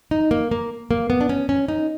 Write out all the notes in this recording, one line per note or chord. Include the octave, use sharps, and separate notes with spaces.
D#4
A#3
A#3
A#3
B3
D4
C#4
C#4
D#4